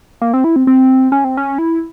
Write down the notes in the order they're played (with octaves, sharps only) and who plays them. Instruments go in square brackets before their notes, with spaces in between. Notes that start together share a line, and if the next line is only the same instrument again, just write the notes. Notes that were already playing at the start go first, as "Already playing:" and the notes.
[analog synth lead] A#3
C4
E4
C4
C4
C#4
C4
C#4
E4